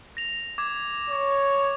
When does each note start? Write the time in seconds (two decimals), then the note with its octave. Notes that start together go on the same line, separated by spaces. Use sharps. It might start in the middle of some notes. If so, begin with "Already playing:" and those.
0.17 A#6 F7
0.58 D6 G#6
1.10 C#5